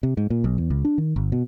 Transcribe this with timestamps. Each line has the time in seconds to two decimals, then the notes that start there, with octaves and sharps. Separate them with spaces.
0.03 C3
0.17 G#2
0.30 A#2
0.44 B1
0.58 E2
0.70 C#2
0.85 D4
0.98 D#3
1.16 G1
1.32 B2